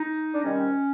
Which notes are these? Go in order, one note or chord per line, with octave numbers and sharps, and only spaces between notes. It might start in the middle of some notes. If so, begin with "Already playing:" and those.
Already playing: D#4
D4
C3 D#3 G3 C4 C#4